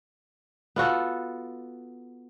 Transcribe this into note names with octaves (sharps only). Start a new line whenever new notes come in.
B3 F4 F#4 A4